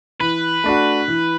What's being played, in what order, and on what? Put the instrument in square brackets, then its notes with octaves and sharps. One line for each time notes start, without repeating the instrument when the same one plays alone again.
[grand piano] E3 [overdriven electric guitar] B4
[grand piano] A3 D4 F#4
E3